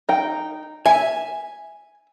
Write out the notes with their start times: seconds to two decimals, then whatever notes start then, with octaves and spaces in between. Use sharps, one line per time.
0.09 D#4 G5
0.86 E5 G#5